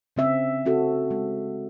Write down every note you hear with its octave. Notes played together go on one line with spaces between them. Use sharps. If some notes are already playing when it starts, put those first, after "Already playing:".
C#3 C4 E5
C4 F#4 A4
G#3